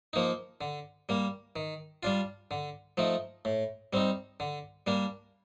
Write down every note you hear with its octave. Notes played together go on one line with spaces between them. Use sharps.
F3 A#3 D#4
D3
G3 A#3
D#3
G3 D4 F4
D3
F3 A3 D#4
A2
G3 C4 D#4
D3
G3 A#3 D4